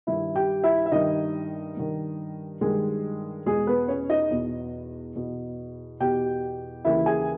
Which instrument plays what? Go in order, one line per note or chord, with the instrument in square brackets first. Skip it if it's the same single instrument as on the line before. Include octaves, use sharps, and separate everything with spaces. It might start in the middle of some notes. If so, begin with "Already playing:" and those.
[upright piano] G2 D#3 E4 E5
G4 G5
E4 E5
E5
G2 D#3 D#4 D#5
G2 D#3
G2 D#3 G#3 G#4
E2 B2 G#3 G#4
B3 B4
C#4 C#5
D#4 D#5
E2 B2
E2 B2
E2 B2 G4 G5
D#2 C#3 E3 E4 E5
G#4 G#5